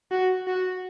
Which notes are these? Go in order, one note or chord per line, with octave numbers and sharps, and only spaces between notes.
F#4
F#4